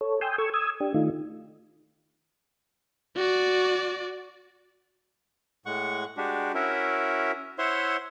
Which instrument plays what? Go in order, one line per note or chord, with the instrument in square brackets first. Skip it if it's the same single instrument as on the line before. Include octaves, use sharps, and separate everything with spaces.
[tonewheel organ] A4 C#5
G5 G#5 C6 D#6 E6 G6
A4 C#6 E6 G#6
D#6 E6 G#6
D4 G4
D#3 A3 D#4 F4
[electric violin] F#4 D5
[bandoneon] A2 G#3 F#5 C#6
G#3 D4 F#4 G4
C#4 E4 F#4 A#4 E5
E4 C5 C#5 E5 F#5 C6